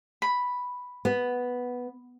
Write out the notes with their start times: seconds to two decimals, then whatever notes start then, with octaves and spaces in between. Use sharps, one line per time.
0.22 B5
1.05 B3